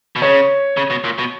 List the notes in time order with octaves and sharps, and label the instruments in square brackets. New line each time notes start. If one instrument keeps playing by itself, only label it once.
[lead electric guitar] B2
[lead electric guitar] C#3 [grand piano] C#5
[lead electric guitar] C#3
B2
A#2
B2